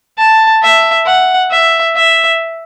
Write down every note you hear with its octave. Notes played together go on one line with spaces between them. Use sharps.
A5
E5
F#5
E5
E5